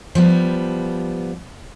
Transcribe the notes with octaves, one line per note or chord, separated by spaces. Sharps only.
F3 G3 B3